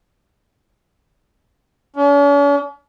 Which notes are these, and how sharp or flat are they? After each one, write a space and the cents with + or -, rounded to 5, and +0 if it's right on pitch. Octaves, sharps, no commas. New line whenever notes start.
C#4 +45